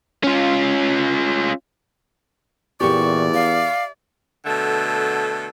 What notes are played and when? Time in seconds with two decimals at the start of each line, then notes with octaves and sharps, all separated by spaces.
0.24 C#4 F4
2.80 E2 A#2 E3 G4 D5 C#6
3.34 E5 F5
4.45 B2 D3 A3 A4